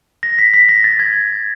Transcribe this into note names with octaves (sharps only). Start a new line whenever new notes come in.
A#6
B6
B6
A#6
A6
G#6